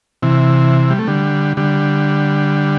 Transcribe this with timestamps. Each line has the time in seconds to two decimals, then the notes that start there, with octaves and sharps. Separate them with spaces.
0.23 C3 E3
0.90 G3
0.99 A3
1.07 D3 G3
1.57 D3 G3